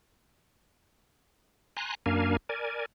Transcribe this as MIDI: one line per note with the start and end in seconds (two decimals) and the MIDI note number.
1.77 1.95 80
1.77 1.95 82
1.77 1.95 84
1.77 1.95 90
2.06 2.37 42
2.06 2.37 58
2.06 2.37 62
2.06 2.37 70
2.06 2.37 77
2.06 2.37 80
2.49 2.86 70
2.49 2.86 74
2.49 2.86 80